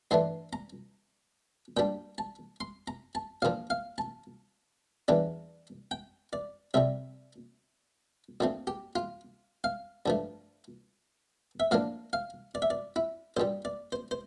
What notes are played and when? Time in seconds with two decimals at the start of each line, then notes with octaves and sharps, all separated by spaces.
0.11 G2 E3 A3 D4 C6
0.53 A#5
1.77 A#2 G3 D4 G5
2.18 A5
2.61 C6
2.88 A#5
3.15 A5
3.42 A#1 A#2 F3 F5
3.70 F5
3.98 A5
5.08 E2 E3 G3 D4
5.91 G5
6.33 D5
6.74 C2 C3 G3 E5
8.40 A#1 A#2 A3 C4
8.67 G4
8.96 F4
9.64 F5
10.06 G2 F3 A3
11.60 E5
11.71 A2 F3 A#3 D4 F5
12.13 F5
12.55 D5
12.62 E5
12.70 D5
12.96 E4
13.37 A#1 A#2 G3 C5
13.65 D5
13.92 C5
14.11 C5